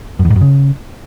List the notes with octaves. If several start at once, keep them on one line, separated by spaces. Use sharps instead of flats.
F#2
E2
G#2
F#2
C#3